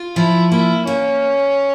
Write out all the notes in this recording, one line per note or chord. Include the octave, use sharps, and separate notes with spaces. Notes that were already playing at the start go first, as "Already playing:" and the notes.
Already playing: F4
F3 E4
A#3 E4
A#3 C#4